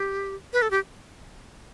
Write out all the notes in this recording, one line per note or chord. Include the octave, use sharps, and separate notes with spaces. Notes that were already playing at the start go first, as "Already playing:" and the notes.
Already playing: G4
B4
A4
G4